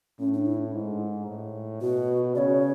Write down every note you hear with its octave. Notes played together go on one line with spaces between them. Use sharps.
A2 C#4
D4
E4
G#2
A2
B2 F#4
C#3 C#5 D5